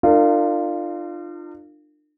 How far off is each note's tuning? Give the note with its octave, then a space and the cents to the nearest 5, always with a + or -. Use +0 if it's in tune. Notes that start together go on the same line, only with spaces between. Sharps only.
D4 +40 F4 -10 A#4 -40